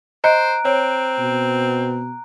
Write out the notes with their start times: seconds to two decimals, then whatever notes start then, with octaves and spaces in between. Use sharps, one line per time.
0.24 C5 D#5 A#5 F#6 D7
0.65 C4 C#5
1.19 B2